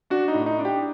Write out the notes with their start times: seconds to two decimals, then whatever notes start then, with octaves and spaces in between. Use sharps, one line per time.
0.10 D4 F#4
0.28 D#4
0.34 A2
0.46 D#4
0.59 D4
0.65 G4